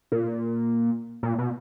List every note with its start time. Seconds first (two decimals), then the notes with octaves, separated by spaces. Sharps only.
0.12 A#2
1.23 A#2
1.39 B2